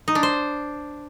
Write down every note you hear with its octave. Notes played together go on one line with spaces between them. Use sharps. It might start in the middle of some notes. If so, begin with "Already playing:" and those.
D#4
D4
C5